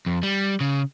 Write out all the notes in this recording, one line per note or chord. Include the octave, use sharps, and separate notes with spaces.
F2
G3
C#3